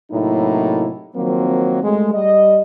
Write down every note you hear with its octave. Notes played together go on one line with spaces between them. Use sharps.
A2 C3 F#3 A#3 D#4 E4
D#3 F3 F#3 A#3 C4
G2 G#3 A3
G3 D#5